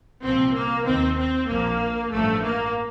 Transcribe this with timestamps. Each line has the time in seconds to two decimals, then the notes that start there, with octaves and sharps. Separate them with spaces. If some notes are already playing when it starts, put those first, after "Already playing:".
0.23 C2 A#2 F3 C4
0.55 A#3
0.86 D#2 D#3 C4
1.17 C4
1.48 A#1 A#2 F3 A#3
2.12 A1 G2 F3 A3
2.43 A#3